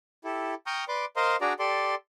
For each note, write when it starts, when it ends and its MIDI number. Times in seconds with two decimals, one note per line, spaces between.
0.24 0.54 64
0.24 0.54 67
0.24 0.54 69
0.66 0.84 79
0.66 0.84 82
0.66 0.84 85
0.66 0.84 87
0.66 0.84 89
0.66 0.84 91
0.88 1.05 71
0.88 1.05 74
0.88 1.05 84
0.88 1.05 86
1.16 1.36 70
1.16 1.36 72
1.16 1.36 75
1.16 1.36 77
1.16 1.36 82
1.16 1.36 84
1.41 1.53 62
1.41 1.53 66
1.41 1.53 68
1.41 1.53 74
1.41 1.53 82
1.59 1.95 67
1.59 1.95 69
1.59 1.95 74
1.59 1.95 84